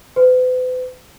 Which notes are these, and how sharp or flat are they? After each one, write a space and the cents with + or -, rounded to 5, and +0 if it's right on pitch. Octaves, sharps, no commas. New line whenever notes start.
B4 +45